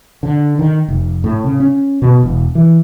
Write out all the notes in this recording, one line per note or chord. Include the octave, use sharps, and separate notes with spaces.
D3
D#3
F1
A2
C#3
C#4
B2
E1
E3